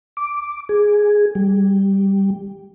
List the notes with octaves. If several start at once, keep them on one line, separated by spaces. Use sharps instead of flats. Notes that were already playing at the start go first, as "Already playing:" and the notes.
D6
G#4
G3